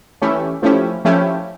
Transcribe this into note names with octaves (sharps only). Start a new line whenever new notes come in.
E3 A3 C#4 E4 G4
F3 A3 C#4 E4 G4
F3 A3 C#4 E4 G4